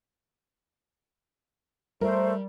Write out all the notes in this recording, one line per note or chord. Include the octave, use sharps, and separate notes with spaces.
G3 A3 A#4 C5